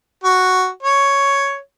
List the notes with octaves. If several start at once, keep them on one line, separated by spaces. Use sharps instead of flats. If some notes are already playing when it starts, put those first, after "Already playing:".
F#4
C#5